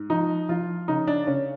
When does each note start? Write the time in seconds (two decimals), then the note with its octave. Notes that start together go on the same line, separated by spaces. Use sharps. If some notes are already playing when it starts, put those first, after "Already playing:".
Already playing: G#2
0.10 F3 D#4
0.49 F3 F4
0.88 C#3 D#4
1.07 D4
1.27 C#3 C#4